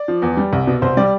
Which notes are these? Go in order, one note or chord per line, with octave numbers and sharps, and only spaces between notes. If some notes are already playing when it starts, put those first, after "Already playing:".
Already playing: D5
F3
E2
G3
C2
B2
C2 C5
G3 D5